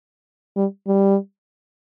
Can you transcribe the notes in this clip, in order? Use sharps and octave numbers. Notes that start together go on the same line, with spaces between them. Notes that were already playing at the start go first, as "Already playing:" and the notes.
G3
G3